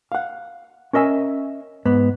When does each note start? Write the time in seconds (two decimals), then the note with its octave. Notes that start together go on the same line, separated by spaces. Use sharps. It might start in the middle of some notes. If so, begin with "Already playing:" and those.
0.12 F5 F#5
0.93 C#4 A#4 D#5 E5 G#5
1.85 G#2 B3